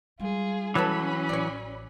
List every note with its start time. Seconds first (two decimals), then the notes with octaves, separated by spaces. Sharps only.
0.20 G3 G#3 F4 G#4
0.75 E3 F#3 C#4 A4 B4 C#5 B5
1.29 A1 C#5 D5